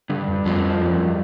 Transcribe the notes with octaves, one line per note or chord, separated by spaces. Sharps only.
G2 D3
F2
F2 F3
G2